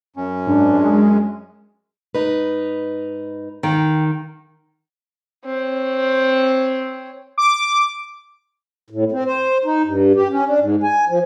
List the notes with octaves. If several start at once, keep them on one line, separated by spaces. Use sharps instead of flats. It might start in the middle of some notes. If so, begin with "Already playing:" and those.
F#2 C#4
G#2 D4
G#3
G#2 D#4 B4
E2 D#3 F5 G5
C4 C#5
D6
A2
C4
C5
D#4
G2
G4
C#4
D4
G#2
G#5
F3